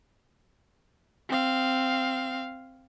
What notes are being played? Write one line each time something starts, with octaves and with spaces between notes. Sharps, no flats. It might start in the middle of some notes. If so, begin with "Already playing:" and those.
C4 F5